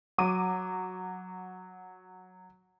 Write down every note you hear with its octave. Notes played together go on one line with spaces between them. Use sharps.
F#3 D6 D#7